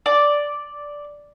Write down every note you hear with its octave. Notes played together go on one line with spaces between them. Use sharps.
D5